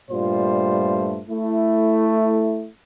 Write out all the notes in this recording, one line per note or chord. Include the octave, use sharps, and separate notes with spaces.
G2 A#2 G3 A3 F4 C5
A3 E4